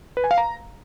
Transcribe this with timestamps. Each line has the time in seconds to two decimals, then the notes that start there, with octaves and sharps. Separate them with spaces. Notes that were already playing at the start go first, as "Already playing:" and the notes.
0.17 B4
0.24 G#5
0.31 F5
0.38 A#5